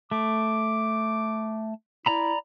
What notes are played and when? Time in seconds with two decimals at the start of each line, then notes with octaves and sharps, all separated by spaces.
0.11 A3 D6
2.06 E4 D5 A#5 B5